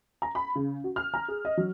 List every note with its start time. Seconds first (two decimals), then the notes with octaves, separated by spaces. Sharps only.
0.22 A#5
0.35 B5
0.55 C#3
0.84 F#4
0.96 F6
1.14 A#5
1.28 G#4
1.45 D#5
1.57 F#3